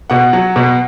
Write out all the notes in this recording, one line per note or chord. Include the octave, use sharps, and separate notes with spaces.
B2 F#5
F#3
B2